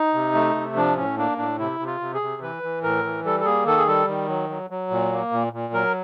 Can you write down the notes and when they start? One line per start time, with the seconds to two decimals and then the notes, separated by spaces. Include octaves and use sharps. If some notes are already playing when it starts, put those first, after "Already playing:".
Already playing: D#4
0.14 C3
0.34 A3
0.55 C3
0.76 F3 D4
0.97 A2 C#4
1.18 A#3 D4
1.38 A2 D4
1.58 C3 E4
1.80 C3
1.87 F4
2.00 C3
2.14 G#4
2.21 C3
2.42 E3 B4
2.63 E3
2.83 A2 A#4
3.04 E3
3.25 G3 A4
3.40 A4
3.45 A#3 G#4
3.66 D#3 A4
3.77 G#4
3.87 G3 A4
4.07 D#3
4.28 F#3
4.49 F#3
4.70 F#3
4.91 A#2
5.12 A#3
5.32 A#2
5.53 A#2
5.73 F#3 A#4